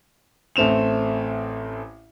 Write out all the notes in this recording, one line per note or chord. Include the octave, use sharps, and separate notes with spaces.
A1 A3 C4 E7 F7